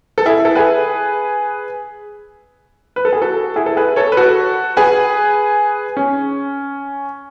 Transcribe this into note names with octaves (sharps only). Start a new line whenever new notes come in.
A4
E4 G#4
A4
G#4 B4
B4
A4
G#4
F#4 A4
E4 G#4
A4
G#4 B4
A4 C#5
B4
F#4 A4
G#4 B4
C#4